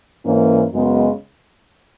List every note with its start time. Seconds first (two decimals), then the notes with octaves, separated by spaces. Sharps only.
0.24 G#2 E3 A#3 C#4
0.70 F#2 C#3 G#3 B3 D#4